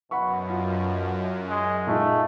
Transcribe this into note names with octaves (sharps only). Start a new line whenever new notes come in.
F#2 B2 F#5 B5 C#6
F4
G#3
A#2 G#3 A3 D#4